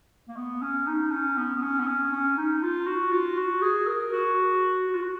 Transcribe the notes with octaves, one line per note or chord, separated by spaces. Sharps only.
A#3
B3
C#4
D#4
C#4
B3
B3
C#4
B3
C#4
C#4
D#4
F4
F#4
F4
F#4
G#4
A#4
F#4
F#4
F4
F#4